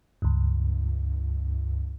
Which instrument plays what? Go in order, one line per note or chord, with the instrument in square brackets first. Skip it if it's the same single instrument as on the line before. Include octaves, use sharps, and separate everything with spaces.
[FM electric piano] C#2 G2